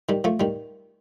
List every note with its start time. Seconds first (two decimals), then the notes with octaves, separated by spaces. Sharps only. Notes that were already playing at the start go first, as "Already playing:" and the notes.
0.09 D#3 G3
0.24 F3 A3
0.40 D#3 G3